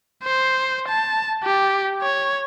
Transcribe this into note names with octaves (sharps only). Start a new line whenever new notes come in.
C5
A5
G4
C#5